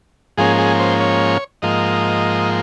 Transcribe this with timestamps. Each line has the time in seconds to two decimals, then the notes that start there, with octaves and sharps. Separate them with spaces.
0.38 G#2 F3 A#3 C#4 G#4
0.58 G#4
0.80 C5
1.00 C#5
1.62 G#2 F3 A#3 D#5